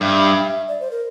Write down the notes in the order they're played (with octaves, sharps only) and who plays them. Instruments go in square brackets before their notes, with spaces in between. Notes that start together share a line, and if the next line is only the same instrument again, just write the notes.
[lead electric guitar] G2 [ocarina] E5
[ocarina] D5
C5
A#4